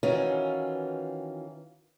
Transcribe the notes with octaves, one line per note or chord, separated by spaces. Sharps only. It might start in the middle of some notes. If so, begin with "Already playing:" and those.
D#3 E3 C#4 F4 F#4